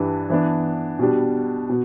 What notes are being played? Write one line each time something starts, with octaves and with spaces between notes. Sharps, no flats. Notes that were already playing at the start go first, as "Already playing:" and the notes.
Already playing: G2 E3 G3 D4
E3 B3 D4
B2 G3 D4
B2